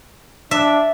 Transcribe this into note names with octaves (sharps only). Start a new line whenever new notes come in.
D4 E5